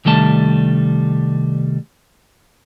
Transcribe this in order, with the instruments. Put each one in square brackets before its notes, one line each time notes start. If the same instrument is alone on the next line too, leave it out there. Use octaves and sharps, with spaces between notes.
[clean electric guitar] C2 D#3 G3 A3 A5